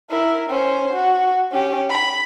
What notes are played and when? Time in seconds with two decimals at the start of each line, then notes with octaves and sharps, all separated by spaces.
0.10 E4 A#4
0.50 C#4 C5
0.93 F#4
1.52 C#4 G4
1.90 B5